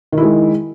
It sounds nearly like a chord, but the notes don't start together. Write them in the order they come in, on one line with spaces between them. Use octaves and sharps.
D#3 E4 G#3